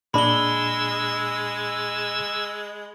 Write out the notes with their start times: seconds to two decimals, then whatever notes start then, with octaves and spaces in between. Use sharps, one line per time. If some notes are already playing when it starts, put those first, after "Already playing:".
0.14 A#2 G#3 D4 B5 E6 G7